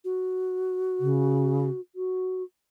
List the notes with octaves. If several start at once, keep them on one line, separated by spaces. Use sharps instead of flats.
F#4
C#3
F#4